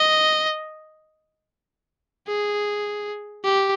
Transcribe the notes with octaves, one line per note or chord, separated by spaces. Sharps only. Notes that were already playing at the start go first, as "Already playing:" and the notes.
Already playing: D#5
G#4
G4